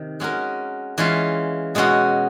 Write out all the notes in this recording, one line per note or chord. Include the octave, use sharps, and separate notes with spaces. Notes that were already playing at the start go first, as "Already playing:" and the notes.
Already playing: C3 D#3
G#3 C#4 F#4 A#4
E3 G#3 C#4 F4
B2 G#3 C#4 F#4